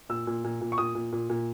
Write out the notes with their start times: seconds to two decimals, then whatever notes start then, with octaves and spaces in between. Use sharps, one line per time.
0.09 A#2 E6
0.27 A#2
0.44 A#2
0.61 A#2
0.72 C#6
0.78 A#2 D#6
0.95 A#2
1.12 A#2
1.30 A#2